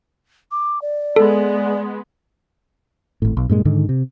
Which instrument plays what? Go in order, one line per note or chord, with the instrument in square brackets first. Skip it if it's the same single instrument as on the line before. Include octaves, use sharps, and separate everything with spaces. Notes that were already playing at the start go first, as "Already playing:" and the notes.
[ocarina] D6
D5
[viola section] G#3 B3 [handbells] A4
[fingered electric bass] G#1 A2
B1
G2 A#2 G#3
G#2 D3 D#3
C3